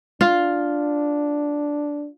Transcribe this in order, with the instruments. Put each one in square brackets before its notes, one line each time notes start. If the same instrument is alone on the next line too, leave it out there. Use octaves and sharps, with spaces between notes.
[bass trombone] D4 [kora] F4 F5